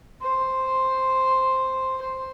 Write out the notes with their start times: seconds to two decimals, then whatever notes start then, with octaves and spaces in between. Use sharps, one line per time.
0.22 C5
2.02 C5